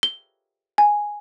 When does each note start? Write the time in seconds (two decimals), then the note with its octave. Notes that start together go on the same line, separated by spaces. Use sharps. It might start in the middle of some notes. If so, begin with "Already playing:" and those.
0.03 G7
0.78 G#5